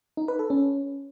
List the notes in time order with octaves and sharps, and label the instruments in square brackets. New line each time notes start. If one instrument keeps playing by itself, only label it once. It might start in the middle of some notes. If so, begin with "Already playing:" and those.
[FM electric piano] D#4
B4
A4
C#4